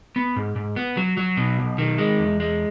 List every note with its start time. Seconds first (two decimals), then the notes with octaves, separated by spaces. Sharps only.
0.16 B3
0.36 G#2
0.56 G#2
0.76 B3
0.97 F#3
1.17 F#3
1.37 B2
1.59 B1
1.78 D#3
1.98 G#3
2.19 E2
2.40 G#3